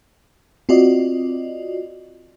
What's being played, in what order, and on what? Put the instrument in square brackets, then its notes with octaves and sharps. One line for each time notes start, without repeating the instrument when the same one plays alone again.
[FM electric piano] C4 F4 F#4 D5 D#5